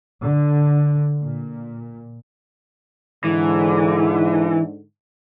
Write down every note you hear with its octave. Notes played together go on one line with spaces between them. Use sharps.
D3
A#2
G#2 D3 E3